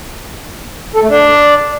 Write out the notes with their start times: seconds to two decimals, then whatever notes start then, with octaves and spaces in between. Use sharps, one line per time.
0.95 A4
1.02 A3
1.09 D4